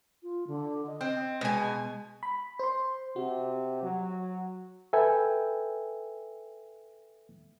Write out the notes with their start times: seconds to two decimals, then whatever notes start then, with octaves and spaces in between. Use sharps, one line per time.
0.23 F4
0.47 D3
0.86 D#5
1.01 C4
1.41 B2 G#3 G#5
2.23 B5
2.59 C5 C6
3.16 C3 F#4
3.82 F#3
4.93 A4 B4 E5 G5 G#5